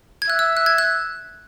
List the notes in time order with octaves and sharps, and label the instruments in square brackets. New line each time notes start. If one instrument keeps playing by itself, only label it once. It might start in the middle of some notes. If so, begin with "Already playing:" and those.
[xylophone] G#6
[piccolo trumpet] E5 [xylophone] F#6
[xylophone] E6
F#6
G#6
F#6